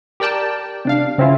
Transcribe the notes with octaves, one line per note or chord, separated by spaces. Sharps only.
G4 A#4 D5 G5 A5
C3 D4 F5
C#3 C4 C#4 E4 F4